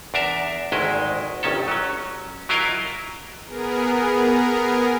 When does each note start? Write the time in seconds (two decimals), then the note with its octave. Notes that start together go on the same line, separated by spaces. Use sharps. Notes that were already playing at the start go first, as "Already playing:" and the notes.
0.14 E2 D4 A#4 E5
0.72 G#1 D2 D#3 G#3 E4 D#5
1.43 G1 C2 D#3 C#4 A4
1.68 F#3 C#4
2.49 F#3 E4 F4 A#4 D#5 F5
3.45 B3 G#4 A#4